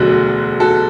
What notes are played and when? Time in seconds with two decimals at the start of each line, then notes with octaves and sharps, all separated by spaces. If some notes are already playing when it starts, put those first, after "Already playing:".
Already playing: E1 D2 D3 F#3 F#4
0.60 F#4 A4